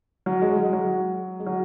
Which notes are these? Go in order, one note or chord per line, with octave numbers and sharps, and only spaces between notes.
F#3
G#3
F#3
G#3
F#3
G#3
F#3